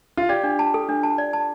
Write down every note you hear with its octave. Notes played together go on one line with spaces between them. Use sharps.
F4
G4 D5
D4
A5
A4
D4
A5
D5
A5